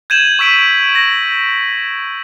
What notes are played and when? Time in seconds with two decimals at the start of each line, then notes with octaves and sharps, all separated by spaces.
0.10 G6 G#6 D#7 E7 F#7
0.39 C#6 E6 B6 D7 F#7
0.95 A#6